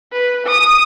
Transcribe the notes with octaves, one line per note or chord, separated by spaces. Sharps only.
B4
D#6